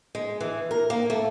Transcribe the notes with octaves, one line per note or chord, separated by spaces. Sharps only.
G#3
E3
A#4
A#3
A3